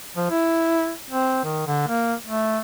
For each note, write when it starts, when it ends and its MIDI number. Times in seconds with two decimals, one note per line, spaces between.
0.16 0.27 53
0.30 0.92 64
1.10 1.39 60
1.44 1.65 51
1.67 1.86 50
1.88 2.14 58
2.24 2.60 57